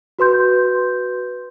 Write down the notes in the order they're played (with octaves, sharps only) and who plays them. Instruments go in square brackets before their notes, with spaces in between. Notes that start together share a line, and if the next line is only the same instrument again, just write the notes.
[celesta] F#4 B4 C6 G6